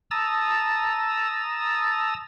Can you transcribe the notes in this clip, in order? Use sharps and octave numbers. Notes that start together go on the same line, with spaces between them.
A5 A#5 D#6 E6 A6